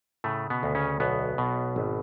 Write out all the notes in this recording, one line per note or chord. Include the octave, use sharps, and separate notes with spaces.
A2 C#3 A3
B2 B3
D2
C#3 C#4
B1 B2 B3
B2
G#1